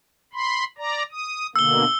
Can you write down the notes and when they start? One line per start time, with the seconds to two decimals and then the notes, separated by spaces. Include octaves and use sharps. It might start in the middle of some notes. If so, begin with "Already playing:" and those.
0.33 B5 C6
0.78 D5 A#5
1.11 D#6
1.56 B2 D3 A#3 E6 G7